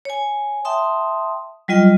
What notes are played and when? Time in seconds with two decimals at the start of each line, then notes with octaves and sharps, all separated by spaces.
0.05 C#5 G#5
0.65 E5 G5 A5 C6 D#6
1.68 F#3 G3 F4 D#5 G5